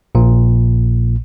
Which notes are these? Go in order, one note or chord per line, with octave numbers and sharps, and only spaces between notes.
A#1 A#2